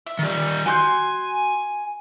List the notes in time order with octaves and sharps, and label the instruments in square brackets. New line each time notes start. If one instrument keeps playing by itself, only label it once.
[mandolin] E5
[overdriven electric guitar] D#3 G3
[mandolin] F#4 C6 G6 [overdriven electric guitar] G#5